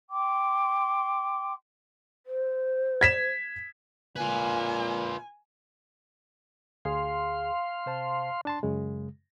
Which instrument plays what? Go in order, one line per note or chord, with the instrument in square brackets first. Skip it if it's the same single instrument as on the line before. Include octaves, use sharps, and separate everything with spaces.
[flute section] G5 C6 D6
[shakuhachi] C5
[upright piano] G#6 B6 E7
[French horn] A#2 [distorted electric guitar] F4 B4 [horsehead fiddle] G#5
[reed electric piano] D2 G#4 [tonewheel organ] F5 C6
[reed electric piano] C3 C5 A5
D4 A5 C6
F#2 C#3 G#3